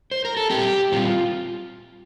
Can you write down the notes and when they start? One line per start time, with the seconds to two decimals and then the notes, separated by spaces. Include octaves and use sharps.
0.11 C5
0.25 A#4
0.37 A4
0.50 A#2 G3 C4 G4
0.92 A#2 G3 C4 F4